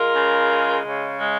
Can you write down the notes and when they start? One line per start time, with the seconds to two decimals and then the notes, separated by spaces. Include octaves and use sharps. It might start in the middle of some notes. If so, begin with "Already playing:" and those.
Already playing: G#3 F4 A#4
0.15 C#3
0.51 G#3
0.85 C#3
1.20 G#3